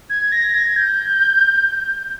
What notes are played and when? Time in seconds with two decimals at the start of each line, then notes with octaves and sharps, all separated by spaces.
0.10 G#6
0.32 A#6
0.54 G#6
0.76 G6